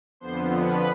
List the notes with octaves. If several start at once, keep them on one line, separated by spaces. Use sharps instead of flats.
F2 D3 F3 B3 C5 C6
B4 B5